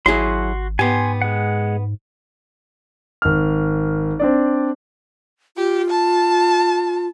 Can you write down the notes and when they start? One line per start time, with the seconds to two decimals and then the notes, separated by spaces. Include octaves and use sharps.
0.06 G#1 F#3 E4 F#4 G#4 C6
0.79 G#2 B3 G4 G#5 C6
1.22 G#3 F#5
3.22 G#1 F6
4.19 C4 D4 D5
5.57 F4 G4
5.90 A5